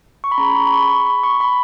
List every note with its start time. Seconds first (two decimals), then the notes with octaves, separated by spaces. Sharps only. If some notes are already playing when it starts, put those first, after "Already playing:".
0.24 C#6
0.32 B5
0.38 C#4 G#4 A#5
0.56 C#6
0.67 B5
0.73 C#6
0.89 C#6
1.06 B5
1.24 C#6
1.40 B5